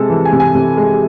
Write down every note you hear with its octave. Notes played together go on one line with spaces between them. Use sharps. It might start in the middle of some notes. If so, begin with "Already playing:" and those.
Already playing: C3 G#3 A4
E3
G#5
C3
G#5
C3
G#3